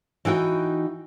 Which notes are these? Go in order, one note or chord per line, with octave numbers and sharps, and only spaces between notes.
E3 D#4 F#4 G5